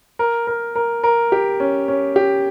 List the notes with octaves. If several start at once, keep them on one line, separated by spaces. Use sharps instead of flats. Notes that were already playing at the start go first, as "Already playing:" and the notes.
A#4
A#4
A#4
A#4
G4
C#4
C#4
G4